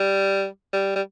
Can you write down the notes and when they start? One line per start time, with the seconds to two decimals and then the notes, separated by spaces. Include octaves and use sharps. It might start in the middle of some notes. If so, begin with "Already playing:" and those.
Already playing: G3
0.73 G3
0.95 G3